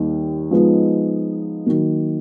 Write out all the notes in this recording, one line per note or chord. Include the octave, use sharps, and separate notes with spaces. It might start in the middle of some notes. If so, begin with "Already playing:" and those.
Already playing: D#2 D#3 G3
F3 G#3 B3 D#4
D#3 F#3 A#3